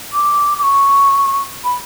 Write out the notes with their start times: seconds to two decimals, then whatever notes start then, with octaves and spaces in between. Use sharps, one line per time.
0.13 D6
0.58 D6
0.63 C#6
1.64 B5